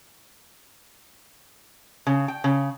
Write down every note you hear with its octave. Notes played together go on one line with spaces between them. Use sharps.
C#3
G5
C#3